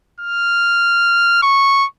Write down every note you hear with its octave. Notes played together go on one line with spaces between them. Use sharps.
F6
C#6